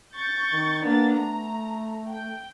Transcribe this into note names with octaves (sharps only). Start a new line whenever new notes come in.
C#6 G6 A6
D#3
A#3 B3 D4 A6
A3 A#5
G5